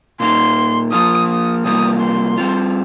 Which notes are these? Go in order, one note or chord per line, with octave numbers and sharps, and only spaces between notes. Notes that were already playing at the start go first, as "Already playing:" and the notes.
A#2 A#3 D#4 C6
F3 A#3 F4 D#6
D#6
C3 G3 A#3 F4 D#6
C6
G3 C4 F4